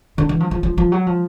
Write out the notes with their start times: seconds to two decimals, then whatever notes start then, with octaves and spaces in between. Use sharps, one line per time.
0.18 D3
0.29 E3
0.40 F3
0.51 F3
0.63 F3
0.78 F3
0.92 F#3
1.07 F3